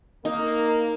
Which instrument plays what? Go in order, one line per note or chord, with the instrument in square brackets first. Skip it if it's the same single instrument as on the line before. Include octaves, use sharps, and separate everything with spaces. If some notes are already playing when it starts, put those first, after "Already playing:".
[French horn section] A#3 A#4 [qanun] D#4